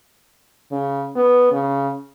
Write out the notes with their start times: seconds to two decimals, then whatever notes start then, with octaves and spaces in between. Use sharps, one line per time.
0.72 C#3
1.16 B3
1.52 C#3